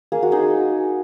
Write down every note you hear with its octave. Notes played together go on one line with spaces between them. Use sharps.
A#3 G#4
F#4
D#4 G#4